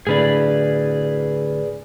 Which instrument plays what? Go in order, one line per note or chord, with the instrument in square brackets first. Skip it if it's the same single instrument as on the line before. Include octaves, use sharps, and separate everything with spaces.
[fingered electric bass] A2 D3 [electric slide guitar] G#4 B4 D5